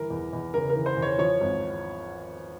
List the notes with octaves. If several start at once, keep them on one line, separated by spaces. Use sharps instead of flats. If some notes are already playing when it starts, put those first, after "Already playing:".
Already playing: G1 E3 A#4
E2
E2
C#3 A#4
A#4
E3
C5
E2
C#5
F3 C#5
G#1